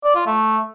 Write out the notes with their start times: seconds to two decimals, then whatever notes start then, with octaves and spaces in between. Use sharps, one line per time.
0.04 D5
0.15 F4
0.27 A3